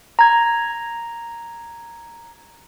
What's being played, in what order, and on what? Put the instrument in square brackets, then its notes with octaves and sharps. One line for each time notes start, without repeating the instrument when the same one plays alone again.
[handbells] A#5 G#6